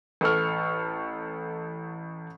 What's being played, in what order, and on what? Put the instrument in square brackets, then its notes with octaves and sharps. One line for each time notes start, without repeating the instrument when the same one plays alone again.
[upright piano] A1 A4 C#6 F6